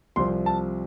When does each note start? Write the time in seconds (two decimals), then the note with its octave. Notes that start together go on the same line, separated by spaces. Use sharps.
0.16 C2 C3 F3 C4 C6
0.46 A5